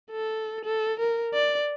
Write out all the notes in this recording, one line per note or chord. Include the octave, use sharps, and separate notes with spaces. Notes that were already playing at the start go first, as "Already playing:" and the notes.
A4
A4
A#4
D5